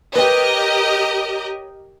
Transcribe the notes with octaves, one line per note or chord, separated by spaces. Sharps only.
G4 A#4 B4 C#5 D#5 G5